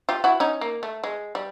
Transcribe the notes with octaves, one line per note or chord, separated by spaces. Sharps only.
F4 G4
E4 F#4
C#4 D#4
A#3
A3
G#3
G3